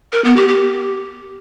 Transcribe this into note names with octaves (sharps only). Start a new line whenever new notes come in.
A#4
B3
G4
G4